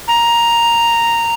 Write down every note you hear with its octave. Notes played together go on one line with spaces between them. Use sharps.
A#5